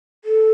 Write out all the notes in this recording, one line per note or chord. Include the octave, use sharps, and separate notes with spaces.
A4